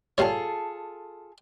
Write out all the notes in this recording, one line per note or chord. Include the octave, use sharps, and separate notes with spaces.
A#2 G3 F4 G#4 A4 C#5